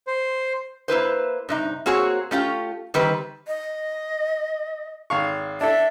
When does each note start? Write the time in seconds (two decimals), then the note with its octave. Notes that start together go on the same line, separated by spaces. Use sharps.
0.07 C5
0.88 A#3 E4 B4 C5
1.49 G2 C3 D#4
1.86 A#3 C4 F#4 G#4 C#5
2.31 A3 C#4 F4 G4
2.94 D#3 G3 C4 B4
3.48 D#5
5.10 G#1 F5 C#6
5.61 D4 E4 A4 E5